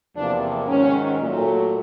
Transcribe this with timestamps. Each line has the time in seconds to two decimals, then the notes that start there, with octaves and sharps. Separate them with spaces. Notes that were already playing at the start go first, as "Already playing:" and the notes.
0.15 E2 C3 F3 A#3 D4
0.67 G#2 D#3 F#3 C#4
1.20 A#2 F#3 A3